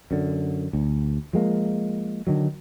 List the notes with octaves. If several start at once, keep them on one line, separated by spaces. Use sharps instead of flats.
F#2 D3
D2
F3 G#3 A#3
D3 D#3 F#3